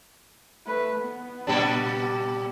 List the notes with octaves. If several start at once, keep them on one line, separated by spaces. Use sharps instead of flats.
A3 B4
B3
A#2 G3 D4